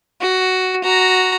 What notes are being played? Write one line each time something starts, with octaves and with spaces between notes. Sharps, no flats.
F#4
F#4 A#5